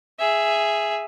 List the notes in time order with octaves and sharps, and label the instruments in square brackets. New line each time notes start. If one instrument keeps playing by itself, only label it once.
[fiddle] G#4 E5